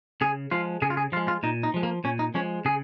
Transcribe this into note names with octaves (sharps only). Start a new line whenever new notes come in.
C#3 G#4
F3 G#3 F4
C#3 G#4
F4
G#4
F3 G#3 F4
F4
A#2 D#4
D#4
F3 G#3
A#3
A#2 C#4
D#4
F3 G#3 C#4
C#3 G#4